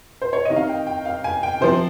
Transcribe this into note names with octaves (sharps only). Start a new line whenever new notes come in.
C5
C#5
C3 D#3 D#5
F5
G5
G5
F5
G#5
G5
C3 F3 C5